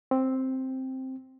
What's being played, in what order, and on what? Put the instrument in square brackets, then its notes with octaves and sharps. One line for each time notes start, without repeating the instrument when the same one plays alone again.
[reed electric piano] C4